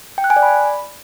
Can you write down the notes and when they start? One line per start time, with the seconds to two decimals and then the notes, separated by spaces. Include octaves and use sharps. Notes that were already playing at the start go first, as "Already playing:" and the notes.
0.18 G5
0.24 F#6
0.30 G#5
0.36 D5
0.43 B5